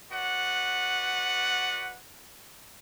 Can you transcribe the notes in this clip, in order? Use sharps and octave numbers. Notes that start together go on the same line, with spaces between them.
F#4 B4 D5 F#5